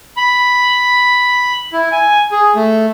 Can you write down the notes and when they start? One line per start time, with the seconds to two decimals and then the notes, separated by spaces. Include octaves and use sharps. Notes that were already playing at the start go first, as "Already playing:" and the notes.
0.17 B5
1.73 E4
1.92 G#5
2.32 G#4
2.56 A3